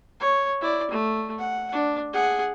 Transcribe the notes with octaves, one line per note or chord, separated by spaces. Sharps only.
C#5
E4 D5
A3
F#5
D4
G#4 F#5